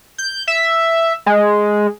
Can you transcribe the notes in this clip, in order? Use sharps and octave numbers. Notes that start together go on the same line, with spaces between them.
G6
E5
G#3